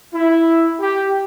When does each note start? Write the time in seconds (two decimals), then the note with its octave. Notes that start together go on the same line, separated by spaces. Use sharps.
0.13 E4
0.80 G4